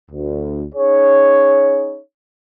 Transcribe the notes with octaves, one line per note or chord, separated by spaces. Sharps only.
D2
C#4 D#4 G#4 C#5